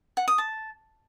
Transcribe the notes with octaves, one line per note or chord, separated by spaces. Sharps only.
F#5
D#6
A5